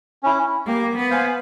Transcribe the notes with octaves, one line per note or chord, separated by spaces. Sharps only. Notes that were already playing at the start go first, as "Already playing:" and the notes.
C#4 E4
A#3 G4
B3
C5 F5 G#5